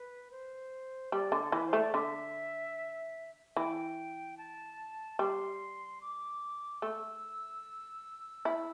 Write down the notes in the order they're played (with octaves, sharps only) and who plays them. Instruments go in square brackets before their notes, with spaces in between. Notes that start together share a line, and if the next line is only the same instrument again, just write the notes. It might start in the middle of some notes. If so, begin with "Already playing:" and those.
Already playing: [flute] B4
C5
[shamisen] G3 [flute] D5
[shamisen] D3
[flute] A4
[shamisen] E3 [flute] B4
[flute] C5
[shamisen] A3
[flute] D5
[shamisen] D3 [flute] E5
[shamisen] E3 [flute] G5
[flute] A5
[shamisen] G3 [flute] C6
[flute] D6
[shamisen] A3 [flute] E6
[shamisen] E4